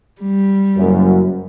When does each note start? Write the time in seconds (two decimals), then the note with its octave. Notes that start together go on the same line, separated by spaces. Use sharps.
0.21 G3
0.77 F#1 F#2